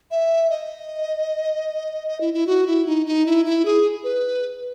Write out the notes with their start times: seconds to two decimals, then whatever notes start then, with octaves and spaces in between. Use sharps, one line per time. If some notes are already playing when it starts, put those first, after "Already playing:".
0.11 E5
0.50 D#5
2.08 D#5
2.21 E4
2.34 E4
2.47 F#4
2.67 E4
2.86 D#4
3.06 D#4
3.26 E4
3.46 E4
3.65 G#4
4.04 B4